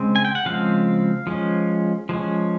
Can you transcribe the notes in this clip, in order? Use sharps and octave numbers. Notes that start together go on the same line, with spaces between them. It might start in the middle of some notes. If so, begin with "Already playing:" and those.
Already playing: C#3 G#3 C4
G#5
G5
F#5
C#3 F3 G#3 C4 F5
F3 G#3 C#4
F3 G#3 C#4